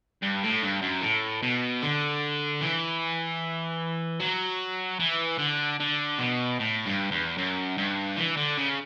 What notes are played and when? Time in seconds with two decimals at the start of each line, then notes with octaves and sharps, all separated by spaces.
0.22 G2
0.43 A2
0.62 G2
0.82 F#2
1.02 A2
1.43 B2
1.82 D3
2.62 E3
4.20 F#3
5.00 E3
5.39 D3
5.80 D3
6.18 B2
6.59 A2
6.86 G2
7.11 E2
7.38 F#2
7.78 G2
8.17 E3
8.37 D3
8.58 C#3